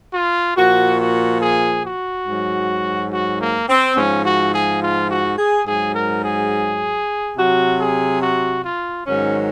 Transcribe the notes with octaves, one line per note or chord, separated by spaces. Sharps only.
F4
A#2 F3 F#4
F#4
G#4
F#4
G#2 F#3
F#4
A#3
C4
G#2 F3 C#4
F#4
G#4
F4
F#4
G#4
G#2 F#3 G#4
A#4
G#4
C3 F#3 F#4
G#4
F#4
F4
G#2 D#3 F#3 C#4